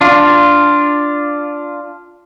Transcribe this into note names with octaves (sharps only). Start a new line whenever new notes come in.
D4 F4